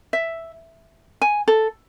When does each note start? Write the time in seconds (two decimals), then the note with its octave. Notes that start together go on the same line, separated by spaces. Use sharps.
0.13 E5
1.22 G#5
1.48 A4